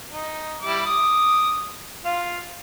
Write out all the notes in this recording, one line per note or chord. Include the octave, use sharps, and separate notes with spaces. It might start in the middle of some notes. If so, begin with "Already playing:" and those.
D#4
G3 E4 D6
D6 D#6
F4 F5